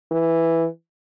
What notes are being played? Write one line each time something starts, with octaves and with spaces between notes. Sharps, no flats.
E3